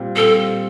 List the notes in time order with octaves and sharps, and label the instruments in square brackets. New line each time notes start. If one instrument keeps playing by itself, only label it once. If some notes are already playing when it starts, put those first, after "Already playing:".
Already playing: [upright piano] A#2 G3 C4 G4
[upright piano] A#2 G3 C4 G4 [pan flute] A4